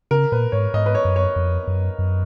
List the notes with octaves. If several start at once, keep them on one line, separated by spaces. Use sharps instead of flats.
C#3 A#4
A#2 B4
G#2 C#5
G#2 D#5
B4
C#5
F#2
C#5
F2
F#2
F#2